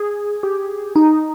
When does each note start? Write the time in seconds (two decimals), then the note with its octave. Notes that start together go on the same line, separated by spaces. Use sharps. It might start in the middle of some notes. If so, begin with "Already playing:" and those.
Already playing: G#4
0.43 G4
0.96 D#4